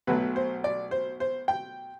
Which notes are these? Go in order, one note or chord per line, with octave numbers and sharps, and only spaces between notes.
B1 B2 F#3 A3 B4
C5
D5
C5
C5
G5